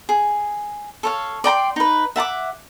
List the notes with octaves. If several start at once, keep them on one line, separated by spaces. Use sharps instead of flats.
G#4
A4 C#5 F5
D5 G5 A#5 C6
D#4 B4
E5 F#5 A5 D6